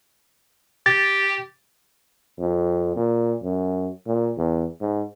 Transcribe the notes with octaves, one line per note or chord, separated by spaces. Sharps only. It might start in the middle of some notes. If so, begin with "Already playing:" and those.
G4 A6
F2
A#2
F#2
A#2
E2
G#2